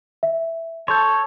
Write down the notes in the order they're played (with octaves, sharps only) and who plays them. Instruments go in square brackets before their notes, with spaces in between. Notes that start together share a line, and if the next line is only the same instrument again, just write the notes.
[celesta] E5
[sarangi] A4 [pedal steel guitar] C#5 [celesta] C6 G6